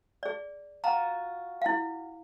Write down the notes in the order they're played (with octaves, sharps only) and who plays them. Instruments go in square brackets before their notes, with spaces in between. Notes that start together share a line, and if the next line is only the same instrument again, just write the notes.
[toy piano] G#4 D5
[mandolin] F4 F#4 [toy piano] A#5
[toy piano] E4 F5